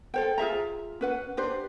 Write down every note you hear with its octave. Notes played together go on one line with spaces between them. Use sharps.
A4 C5 G5
F4 G#4 E5 A#5
C#4 B4 F#5
D4 G4 B4 C5